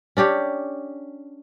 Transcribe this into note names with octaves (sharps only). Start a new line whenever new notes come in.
C#4 D4 G4 C#5